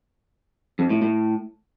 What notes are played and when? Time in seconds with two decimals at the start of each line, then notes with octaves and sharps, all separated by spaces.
0.79 F2
0.90 A2
1.02 A2